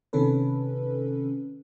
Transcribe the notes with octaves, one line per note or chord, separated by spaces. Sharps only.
C3 D#3 C#4 A4 B4